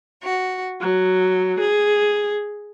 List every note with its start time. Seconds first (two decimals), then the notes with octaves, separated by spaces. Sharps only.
0.23 F#4
0.80 F#3
1.58 G#4